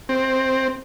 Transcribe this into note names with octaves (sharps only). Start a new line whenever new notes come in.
C4